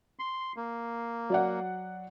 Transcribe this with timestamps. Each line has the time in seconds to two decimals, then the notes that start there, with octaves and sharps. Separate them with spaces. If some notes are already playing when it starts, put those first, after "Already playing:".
0.19 C6
0.56 A#3
1.30 F#3 D5 F#5